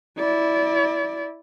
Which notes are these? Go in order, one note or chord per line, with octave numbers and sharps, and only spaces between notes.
E4 D5